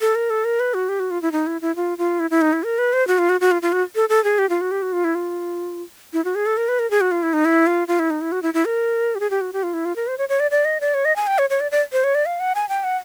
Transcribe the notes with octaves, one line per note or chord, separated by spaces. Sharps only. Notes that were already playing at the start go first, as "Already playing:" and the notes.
A4
A#4
A4
A#4
B4
F#4
G4
F#4
F4
E4
D#4
E4
E4
F4
F4
E4
E4
D#4
E4
A#4
B4
C5
F#4
F4
F#4
F#4
F4
F4
F#4
A4
A4
G#4
G4
F4
F#4
G4
F#4
F4
E4
F4
E4
F#4
G#4
A4
A#4
B4
A#4
G#4
F#4
F4
E4
D#4
E4
F4
F4
E4
D#4
E4
F#4
E4
E4
A#4
G4
G#4
G4
F#4
G4
F4
E4
F4
A#4
C5
C#5
C#5
D5
D5
D#5
D5
C#5
D#5
G#5
G5
C#5
C#5
D5
D5
C5
C#5
D5
F5
F#5
G#5
G5
F#5